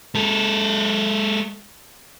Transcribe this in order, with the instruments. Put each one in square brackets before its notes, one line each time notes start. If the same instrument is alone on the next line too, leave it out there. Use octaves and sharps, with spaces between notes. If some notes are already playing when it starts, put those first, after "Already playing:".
[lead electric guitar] G#3 A4